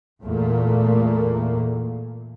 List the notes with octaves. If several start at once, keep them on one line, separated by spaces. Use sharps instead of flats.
E2 A#2 A3 A#3